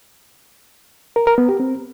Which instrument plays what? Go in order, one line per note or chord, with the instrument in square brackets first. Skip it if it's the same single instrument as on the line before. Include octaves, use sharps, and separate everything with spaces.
[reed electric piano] A#4
A#4
B3
G4
C4